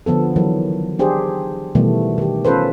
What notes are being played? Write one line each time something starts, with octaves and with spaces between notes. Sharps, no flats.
D3 F3 B3 A4
D#3 E3 F#3
D4 G4 G#4 C5
B2 D#3 E3 G3 A3 B3
D#3 G4
C#4 F4 A4 B4 C5